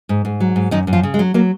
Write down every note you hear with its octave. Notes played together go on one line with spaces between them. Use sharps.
G#2
G#2
F#3
G#2
F#2 D#3 D#4
F#2
F3 F4
C#3
G#3
F#3
F#3 A#3